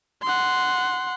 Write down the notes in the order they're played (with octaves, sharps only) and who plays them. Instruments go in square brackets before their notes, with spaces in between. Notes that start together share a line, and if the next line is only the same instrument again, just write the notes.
[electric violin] F#5 C6